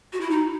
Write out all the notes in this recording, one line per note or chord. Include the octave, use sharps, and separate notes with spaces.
F#4
E4
D#4